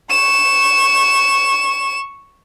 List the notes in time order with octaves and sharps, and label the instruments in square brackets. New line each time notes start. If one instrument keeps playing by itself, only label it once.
[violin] C#6 E7